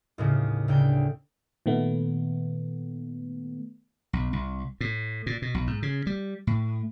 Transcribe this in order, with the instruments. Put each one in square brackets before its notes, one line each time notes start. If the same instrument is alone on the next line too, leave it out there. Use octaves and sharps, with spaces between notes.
[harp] D#2 A2 C#3
D2 C#3 G5
[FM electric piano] A#2 D#3 A3 B3
[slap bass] B1
C2
A2
A#2
B2
B1
G#2
C#3
G3
A2